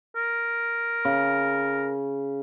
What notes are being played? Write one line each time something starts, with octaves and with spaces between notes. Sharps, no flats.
A#4
C#3